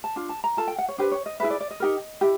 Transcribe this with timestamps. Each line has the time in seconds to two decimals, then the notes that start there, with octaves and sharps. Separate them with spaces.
0.04 A5
0.16 D4 F4
0.29 A5
0.44 A#5
0.57 F4 A4 A5
0.68 G5
0.78 F#5
0.89 C#5
0.98 D4 G4 B4 C5
1.12 C#5
1.26 D#5
1.40 E4 G#4 B4 E5
1.50 D5
1.61 D5
1.71 D#5
1.80 D#4 G4 A#4
2.21 E4 G4